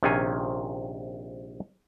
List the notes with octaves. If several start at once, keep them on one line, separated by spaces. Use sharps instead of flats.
A#1 C3 D#3 C#4 F4 G#5